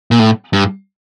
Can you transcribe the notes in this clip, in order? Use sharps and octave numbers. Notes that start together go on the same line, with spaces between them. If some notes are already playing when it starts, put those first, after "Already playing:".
A#2
A2
G2